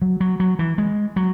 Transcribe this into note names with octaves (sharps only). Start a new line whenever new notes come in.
F#3
F#3
F#3
E3
G#3
F#3